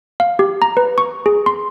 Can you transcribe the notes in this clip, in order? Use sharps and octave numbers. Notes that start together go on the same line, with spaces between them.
F5
G4
A#5
B4
C#6
G#4
C6